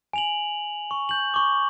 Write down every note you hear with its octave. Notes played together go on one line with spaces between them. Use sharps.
G#5 F7 F#7
C#6
G6 F#7
C#6 D6